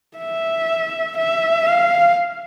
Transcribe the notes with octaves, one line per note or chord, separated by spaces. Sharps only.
E5
E5
F5